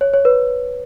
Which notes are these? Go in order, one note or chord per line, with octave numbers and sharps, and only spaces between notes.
C#5
C#5
B4